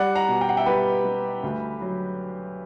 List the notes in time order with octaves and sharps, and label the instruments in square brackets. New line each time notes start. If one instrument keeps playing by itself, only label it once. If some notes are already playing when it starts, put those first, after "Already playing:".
Already playing: [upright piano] G3 D5 F#5
F#5 A#5
B2
G5
F#5
E5 G5
G3 G4 B4
G3
D2
F#3